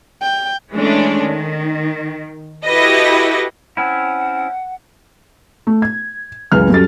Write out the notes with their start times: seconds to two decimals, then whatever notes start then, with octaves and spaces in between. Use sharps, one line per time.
0.22 G5
0.73 E3 G#3 A3 C#4 D4
1.22 D#3
2.66 E4 F#4 G4 A4 B4 D#5
3.77 C4 C#4 E4 F#5
5.67 A3
5.82 G#6
6.52 C#2 F#2 E3 F6
6.70 F#2 G3 F#4 A4 A6